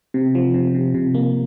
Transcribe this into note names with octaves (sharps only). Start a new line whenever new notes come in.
C3
F3
C3
C3
C3
A#3